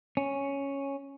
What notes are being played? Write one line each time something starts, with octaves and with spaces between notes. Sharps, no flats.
C#4